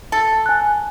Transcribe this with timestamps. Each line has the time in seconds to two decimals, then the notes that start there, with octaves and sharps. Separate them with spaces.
0.12 A4
0.46 G#5 F#6